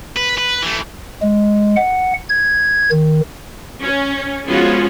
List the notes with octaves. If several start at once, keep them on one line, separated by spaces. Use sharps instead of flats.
B4
B4
E3 A3
G#3
F#5
G#6
D#3
C#4
F3 G#3 B3 C#4 F4 F#4